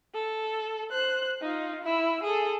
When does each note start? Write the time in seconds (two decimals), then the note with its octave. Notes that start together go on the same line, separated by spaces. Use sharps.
0.14 A4
0.91 C5 F#6
1.41 D#4 F4
1.84 E4 E6
2.23 G#4 A4